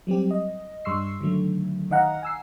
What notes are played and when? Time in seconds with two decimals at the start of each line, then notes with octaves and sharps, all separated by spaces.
0.07 F#3 G3 C4 G4
0.31 D#5
0.85 G2 G3 C6 C#6 E6 C7
1.21 D3 D#3 F#3 A3
1.91 D#3 D#5 F5 F#5 A#5
2.23 G#5 E6 C7